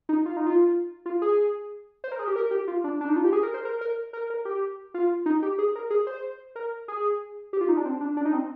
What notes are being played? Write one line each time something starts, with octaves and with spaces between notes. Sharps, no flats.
D#4
F4
D#4
F4
F4
G#4
C5
A#4
G#4
G4
A#4
G4
F4
D4
D4
D#4
F4
G4
G#4
A#4
C5
A#4
A#4
A#4
A#4
G4
F4
D#4
G4
G#4
A#4
G#4
C5
A#4
G#4
G4
F4
D#4
D4
C4
D4
D4
D#4
C4